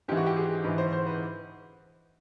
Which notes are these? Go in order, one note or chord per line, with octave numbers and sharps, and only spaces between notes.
G#2 E3 G4
F#4
G4
G#4
G#2 E3 B4
C5
C5
B4